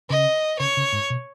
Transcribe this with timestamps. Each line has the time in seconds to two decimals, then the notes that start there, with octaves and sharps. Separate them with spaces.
0.10 C#3 D#5
0.59 C#3 C#5
0.77 C#3
0.92 G#2
1.10 B2